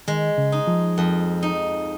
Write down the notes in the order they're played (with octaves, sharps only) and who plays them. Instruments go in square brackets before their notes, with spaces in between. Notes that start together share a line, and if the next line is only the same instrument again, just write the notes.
[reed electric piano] D#3 [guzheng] G#3
[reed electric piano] C#3
[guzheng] D#4
[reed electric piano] F3
[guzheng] F2
D#4